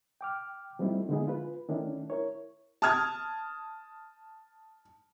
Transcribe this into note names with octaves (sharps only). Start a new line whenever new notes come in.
G5 D6 F6
F3 G3 A3 C4 D#4 E4
D3 G#3 B3 D#4 E4 G#4
F4 B4
D#3 A3 C#4 D4 E4
E4 A#4 C#5
A5 D#6 F6 G#6